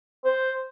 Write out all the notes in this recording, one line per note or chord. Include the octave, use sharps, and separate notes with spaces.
C5